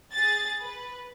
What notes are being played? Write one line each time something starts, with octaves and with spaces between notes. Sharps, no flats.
G#4 A6
B4